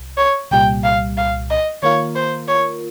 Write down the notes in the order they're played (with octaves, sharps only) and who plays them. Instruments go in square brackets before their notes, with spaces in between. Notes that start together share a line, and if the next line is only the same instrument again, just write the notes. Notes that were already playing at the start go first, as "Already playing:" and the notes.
Already playing: [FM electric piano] C2
[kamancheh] C#5
[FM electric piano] C2 A#2 G3 [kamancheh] G5
[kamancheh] F5
F5
D#5
[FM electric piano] D#3 A#3 F4 A#4 [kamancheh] C#5
[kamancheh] C5
C#5